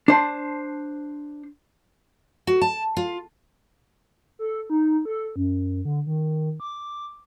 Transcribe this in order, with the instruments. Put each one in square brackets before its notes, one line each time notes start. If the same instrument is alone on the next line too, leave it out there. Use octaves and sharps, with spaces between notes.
[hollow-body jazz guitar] D4 C5 A5
[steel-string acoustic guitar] F#4
A5
F4
[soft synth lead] A4
D#4
A4
F#2
D3
D#3
D6